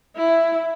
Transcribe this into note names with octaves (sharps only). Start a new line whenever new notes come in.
E4